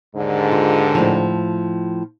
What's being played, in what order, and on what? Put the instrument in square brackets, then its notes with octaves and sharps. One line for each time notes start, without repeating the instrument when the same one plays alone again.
[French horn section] D#2 G#2 D3
[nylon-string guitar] F4
A2 F3